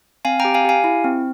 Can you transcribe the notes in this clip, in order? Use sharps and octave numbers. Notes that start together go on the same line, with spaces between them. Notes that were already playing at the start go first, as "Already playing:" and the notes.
C4 F5 G#5
G5 A#5
G4
F5 G#5
G4 F5 G#5
E4
C4